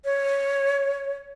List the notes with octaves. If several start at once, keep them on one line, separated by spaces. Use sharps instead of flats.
C#5